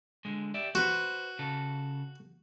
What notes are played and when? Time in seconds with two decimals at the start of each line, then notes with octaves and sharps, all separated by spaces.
0.25 D3 G#3
0.54 G4 D5 E5
0.75 F#4 B4 C5
1.39 C#3 A4